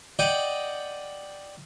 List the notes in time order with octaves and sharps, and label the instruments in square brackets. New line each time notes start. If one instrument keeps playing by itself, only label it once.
[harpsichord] D5 D#5 F#5 G5